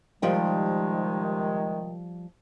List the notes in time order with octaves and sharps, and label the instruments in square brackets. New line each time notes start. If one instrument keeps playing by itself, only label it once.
[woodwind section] C3 D#3 G#3 [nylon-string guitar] F3 G3 G5